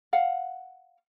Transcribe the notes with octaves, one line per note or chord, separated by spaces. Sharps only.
F5 F#5